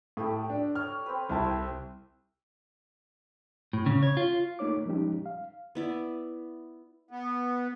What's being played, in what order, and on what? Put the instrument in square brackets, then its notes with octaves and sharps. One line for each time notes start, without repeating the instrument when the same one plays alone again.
[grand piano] A2 [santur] G4 A4 D#6
[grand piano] D4
[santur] C#5 [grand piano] F6
[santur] C4 B4
[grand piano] C2 E4 A5 [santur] C5
[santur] C4
[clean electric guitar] A2
C#3
C#5
F4
[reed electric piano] A3 A#3 D#4 C#5 D6
F3 G3 G#3 C#4 D#4 G4
F5
[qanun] B3 E4 D5
[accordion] B3